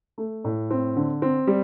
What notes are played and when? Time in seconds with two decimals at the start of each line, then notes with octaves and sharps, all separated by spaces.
0.18 A3
0.44 A2
0.71 C4
0.96 D3
1.22 C4
1.47 G3